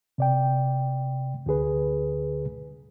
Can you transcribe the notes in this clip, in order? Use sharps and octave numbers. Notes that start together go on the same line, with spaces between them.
C3 D5 G5
D2 D3 G#4 B4